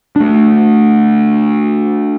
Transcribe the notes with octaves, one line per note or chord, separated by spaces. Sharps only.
A3 D4